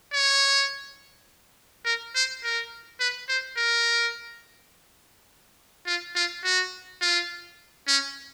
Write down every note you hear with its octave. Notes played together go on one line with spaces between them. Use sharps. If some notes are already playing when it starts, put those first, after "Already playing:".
C#5
A#4
C5
A#4
B4
C5
A#4
F4
F4
F#4
F4
C#4